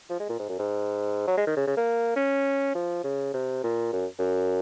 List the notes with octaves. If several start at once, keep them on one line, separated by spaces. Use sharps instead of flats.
F3
G#3
A#2
G#2
F#2
G#2
F#3
G#3
D#3
C#3
C#3
A#3
C#4
F3
C#3
C3
A#2
F#2
F#2